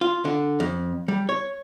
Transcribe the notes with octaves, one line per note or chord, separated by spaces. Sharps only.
F4
D3
F2
G3
C#5